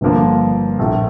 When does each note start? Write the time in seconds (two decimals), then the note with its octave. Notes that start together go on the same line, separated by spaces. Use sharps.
0.01 G1 G2 D3 F3 A#3
0.79 A#1 A2 A3